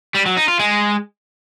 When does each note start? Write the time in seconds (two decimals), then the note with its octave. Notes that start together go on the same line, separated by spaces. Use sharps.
0.15 G3
0.26 F#3
0.37 D#4
0.48 F4
0.59 G#3